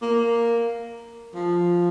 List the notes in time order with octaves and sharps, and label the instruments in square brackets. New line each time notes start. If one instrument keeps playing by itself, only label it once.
[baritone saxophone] A#3
F3